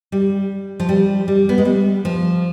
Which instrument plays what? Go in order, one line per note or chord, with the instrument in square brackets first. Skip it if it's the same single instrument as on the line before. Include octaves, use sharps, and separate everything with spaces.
[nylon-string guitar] G3
F3
G3
G3
B3
G#3
G3
F3